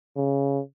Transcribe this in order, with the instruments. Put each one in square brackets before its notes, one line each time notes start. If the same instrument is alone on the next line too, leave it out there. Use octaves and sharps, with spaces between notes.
[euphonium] C#3